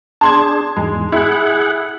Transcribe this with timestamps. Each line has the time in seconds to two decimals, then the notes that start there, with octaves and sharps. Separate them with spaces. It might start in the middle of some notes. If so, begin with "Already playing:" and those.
0.21 D4 G#4 A5 C6 G#6
0.77 E2 G#2 G#3
1.12 E4 G#4 F#5